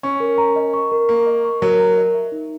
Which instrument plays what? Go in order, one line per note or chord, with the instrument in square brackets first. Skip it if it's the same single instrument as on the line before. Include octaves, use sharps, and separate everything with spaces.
[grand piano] C#4 [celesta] C#6
[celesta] A#4
A#5
D#5
C#6
A#4
[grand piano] A#3 [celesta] A#5
[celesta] D#5
C#6
[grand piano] F#3 [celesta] A#4
[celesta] A#5
D#5
E5
D#4